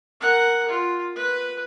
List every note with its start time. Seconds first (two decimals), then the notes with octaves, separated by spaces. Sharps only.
0.21 A#4 F#5
0.69 F4
1.16 B4